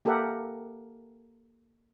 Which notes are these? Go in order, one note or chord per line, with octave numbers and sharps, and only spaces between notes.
A#3 G4 A4 A#4 E5 F#5